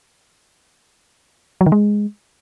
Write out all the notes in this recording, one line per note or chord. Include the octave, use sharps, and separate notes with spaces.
F#3
D#3
G#3